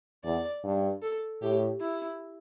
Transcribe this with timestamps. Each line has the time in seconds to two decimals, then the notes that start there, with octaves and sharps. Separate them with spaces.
0.24 E2 D5
0.64 G2
1.02 A4
1.42 A2 G4
1.80 E4